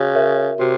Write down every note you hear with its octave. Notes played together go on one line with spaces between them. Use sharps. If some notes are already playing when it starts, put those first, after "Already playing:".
Already playing: C#3 F#4
A#4 C#5 E5
C3 F#4